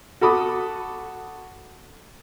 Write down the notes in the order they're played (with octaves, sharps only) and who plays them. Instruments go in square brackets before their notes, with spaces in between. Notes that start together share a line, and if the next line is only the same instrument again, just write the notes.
[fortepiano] F#4 A4 B5 D6 D#6